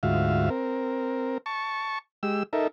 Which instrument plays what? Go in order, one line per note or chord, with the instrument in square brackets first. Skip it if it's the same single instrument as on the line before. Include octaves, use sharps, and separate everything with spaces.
[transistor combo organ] D2 G#2 F4 F#4 E5 F5
C4 A#4
A5 C#6
G#3 G4 E6
D#4 A4 A#4 E5